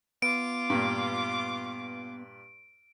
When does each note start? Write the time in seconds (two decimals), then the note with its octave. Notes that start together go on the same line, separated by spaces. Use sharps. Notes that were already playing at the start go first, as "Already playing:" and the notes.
0.22 B3 F4 D6 D7
0.70 G2 A#2